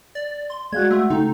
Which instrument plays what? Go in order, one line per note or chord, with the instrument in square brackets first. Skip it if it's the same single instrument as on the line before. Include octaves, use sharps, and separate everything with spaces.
[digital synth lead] D5
C6
[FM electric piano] G#3 F#4 [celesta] D5 F5 F#6 [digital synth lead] G#6
[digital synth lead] A3 [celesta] F#5 C6 E6
[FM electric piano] C#3 A3 [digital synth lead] D#4 [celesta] G5 C6